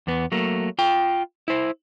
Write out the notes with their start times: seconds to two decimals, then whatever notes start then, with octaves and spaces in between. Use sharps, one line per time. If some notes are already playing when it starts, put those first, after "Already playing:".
0.07 E2 B3
0.32 F#3 A3 A#3
0.79 F4 G5
1.48 E4 C5